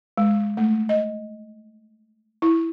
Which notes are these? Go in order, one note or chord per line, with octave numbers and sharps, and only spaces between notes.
G#3
A3
D#5
E4